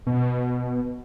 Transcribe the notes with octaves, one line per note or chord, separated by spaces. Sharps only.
B2